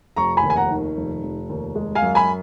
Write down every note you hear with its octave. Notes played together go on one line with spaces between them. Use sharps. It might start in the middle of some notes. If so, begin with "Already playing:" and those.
F1 A#5 C#6
G#5 B5
D#2
G#5
F#5 A#5
D#3
F1
F1
D#2
G#3
F5 G#5
F#2
G#5 B5